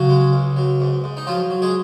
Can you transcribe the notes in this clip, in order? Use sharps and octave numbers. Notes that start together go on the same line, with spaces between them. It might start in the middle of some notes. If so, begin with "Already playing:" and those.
Already playing: C#3 F#3 F#4
G#3
C#2
F#3
G#2
G#2
D#4
F3 F#3 F4
F#3
G#3 G#4